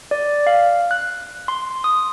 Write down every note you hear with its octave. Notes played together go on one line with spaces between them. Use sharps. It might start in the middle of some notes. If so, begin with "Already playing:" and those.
D5
F5
F#6
C6
D#6